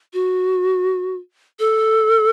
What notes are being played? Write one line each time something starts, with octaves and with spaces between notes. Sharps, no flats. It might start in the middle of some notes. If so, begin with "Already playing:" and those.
F#4
A4